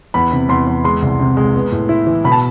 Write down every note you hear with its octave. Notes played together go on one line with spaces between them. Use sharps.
E2 B5
C3
E2 C6
E2
G#3 C6
C2
C3
G#3
B3
A2
E4
E3
B2 B5
A5